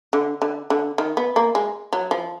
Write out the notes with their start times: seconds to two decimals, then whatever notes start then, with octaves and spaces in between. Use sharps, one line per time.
0.13 D3
0.42 D3
0.70 D3
0.98 D#3
1.17 B3
1.36 A#3
1.55 G#3
1.93 F#3
2.11 F3